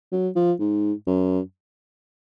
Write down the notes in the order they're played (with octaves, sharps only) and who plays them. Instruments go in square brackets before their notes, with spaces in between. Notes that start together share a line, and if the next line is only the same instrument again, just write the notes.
[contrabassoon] F#3
F3
G#2
F#2